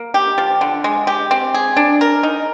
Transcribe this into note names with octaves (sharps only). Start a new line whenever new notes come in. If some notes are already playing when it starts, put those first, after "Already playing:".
Already playing: A#3
G4
F3
D3
G#3
G4
C4
G#4
D4
A#4
D#4